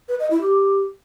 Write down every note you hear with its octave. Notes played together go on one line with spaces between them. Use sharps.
B4
D#5
E4
G4